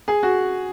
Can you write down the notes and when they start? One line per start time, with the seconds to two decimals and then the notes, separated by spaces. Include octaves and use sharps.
0.08 G#4
0.23 F#4